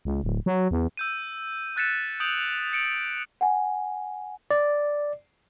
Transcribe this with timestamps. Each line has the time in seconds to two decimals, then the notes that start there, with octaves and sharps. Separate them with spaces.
0.05 C#2
0.24 D1
0.46 F#3
0.71 E2
0.97 E6 G6 D#7
1.76 E6 F#6 A6 B6 C#7 E7
2.20 D#6 G6 D7 F7 F#7
2.73 C#7 D7 F#7
3.41 F#5 G#5
4.51 D5